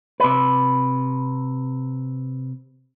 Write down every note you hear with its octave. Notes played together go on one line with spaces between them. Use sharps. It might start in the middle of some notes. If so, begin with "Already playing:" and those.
C3 B4